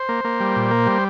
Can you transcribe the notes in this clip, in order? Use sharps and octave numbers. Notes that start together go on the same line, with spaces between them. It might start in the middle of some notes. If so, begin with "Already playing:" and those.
Already playing: C5
A#3
A#3
G3
A#2
A#3
G3